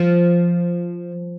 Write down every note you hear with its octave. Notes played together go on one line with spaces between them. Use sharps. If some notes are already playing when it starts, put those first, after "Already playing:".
Already playing: F3